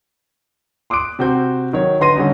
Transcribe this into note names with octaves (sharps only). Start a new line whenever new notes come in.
C6 D6 D#6 F#6 D7
C3 C4 F#4 C5 G6
D#3 F#3 C#5
D3 D#4 B4 C6 A#6 D#7
D3 G3 C#4 D#4